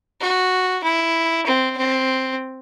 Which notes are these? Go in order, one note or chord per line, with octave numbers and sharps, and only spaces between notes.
F#4
E4
C4
C4